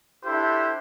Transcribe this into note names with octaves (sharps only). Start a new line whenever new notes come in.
D4 E4 G4 A4 C5